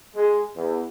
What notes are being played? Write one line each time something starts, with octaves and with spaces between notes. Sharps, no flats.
G#3
E2